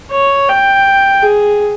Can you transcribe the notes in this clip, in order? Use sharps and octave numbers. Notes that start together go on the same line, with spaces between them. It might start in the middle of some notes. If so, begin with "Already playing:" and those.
C#5
G5
G#4